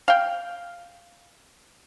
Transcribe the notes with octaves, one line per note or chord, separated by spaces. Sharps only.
F5 G5